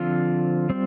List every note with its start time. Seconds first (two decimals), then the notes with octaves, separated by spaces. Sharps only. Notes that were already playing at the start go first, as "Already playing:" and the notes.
Already playing: D3 F3 C4 F4
0.70 G3 C4